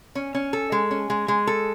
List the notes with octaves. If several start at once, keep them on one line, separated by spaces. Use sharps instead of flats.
C#4
C#4
A4
G#3
C#4
G#3
G#3
A4